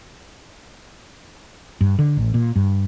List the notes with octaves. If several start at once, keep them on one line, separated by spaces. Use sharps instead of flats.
G2
D3
A1
A#2
G2